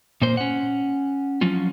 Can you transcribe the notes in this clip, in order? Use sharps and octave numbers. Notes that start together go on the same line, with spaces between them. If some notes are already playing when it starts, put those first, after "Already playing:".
A#2 A#3 C5
C#4 F#5
F3 F#3 C#4 F4